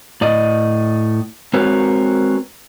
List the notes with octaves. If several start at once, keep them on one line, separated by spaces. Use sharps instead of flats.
A2 D5 D#5
G#3 C4 F#4 A#4 B4 C#5